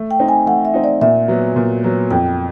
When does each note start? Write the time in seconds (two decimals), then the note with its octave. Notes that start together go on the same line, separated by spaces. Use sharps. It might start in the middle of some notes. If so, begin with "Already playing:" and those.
Already playing: A3
0.11 G5
0.20 C4 D#4
0.28 G#5
0.46 A3 F#5
0.65 E5
0.74 C4 D#4
0.84 D5
1.01 A#2 E5
1.28 F#3 B3
1.56 A#2
1.83 F#3 B3
2.11 F2 G5